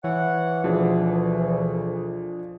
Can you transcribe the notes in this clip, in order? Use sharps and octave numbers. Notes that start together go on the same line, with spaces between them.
E3 C#5 F#5
D2 B2 F3 D4 G#4